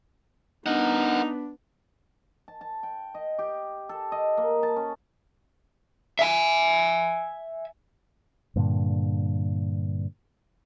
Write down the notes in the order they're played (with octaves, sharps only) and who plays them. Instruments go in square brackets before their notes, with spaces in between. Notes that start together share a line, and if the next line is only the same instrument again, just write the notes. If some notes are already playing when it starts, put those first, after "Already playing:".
[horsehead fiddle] B3 [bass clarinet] D4 [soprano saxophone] D#4 [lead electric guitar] A#4 F#5
[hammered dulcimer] A5
A5
G5
D#5
G4
A4
D#5
A#3
A5
C#4
[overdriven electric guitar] E5 G#5
[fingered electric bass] G2 A#2 D3